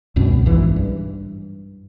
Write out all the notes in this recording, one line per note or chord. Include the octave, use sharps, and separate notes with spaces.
C#2 F#2 B2 C4
A#1 G#2 E3
G2